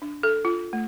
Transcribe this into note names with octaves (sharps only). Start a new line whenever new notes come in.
D4
A4
F4
A3